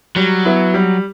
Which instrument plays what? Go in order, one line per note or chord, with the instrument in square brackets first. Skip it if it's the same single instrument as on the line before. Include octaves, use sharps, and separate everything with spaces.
[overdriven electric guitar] F#3 [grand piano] G3
[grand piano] B3 E4
G3